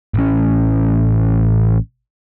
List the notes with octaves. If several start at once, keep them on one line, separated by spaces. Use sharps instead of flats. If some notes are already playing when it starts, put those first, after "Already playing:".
A1 C#4